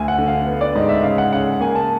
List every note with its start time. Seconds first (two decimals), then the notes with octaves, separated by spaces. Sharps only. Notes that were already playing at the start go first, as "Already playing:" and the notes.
Already playing: D2 G#5
0.08 F#5
0.18 D3
0.28 F5
0.46 B3
0.61 D5
0.75 G#2 D#5
0.89 E5
1.03 C#3 F5
1.18 F#5
1.32 C#3 F#5
1.60 A#3 G#5
1.76 A5